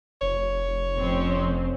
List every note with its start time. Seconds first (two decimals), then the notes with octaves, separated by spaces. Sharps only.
0.21 F1 C#5
0.97 F2 C4 C#4